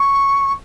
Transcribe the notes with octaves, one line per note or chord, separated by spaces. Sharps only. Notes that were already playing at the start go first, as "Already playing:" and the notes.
Already playing: C#6